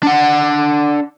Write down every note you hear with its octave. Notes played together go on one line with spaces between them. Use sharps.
D4 F#5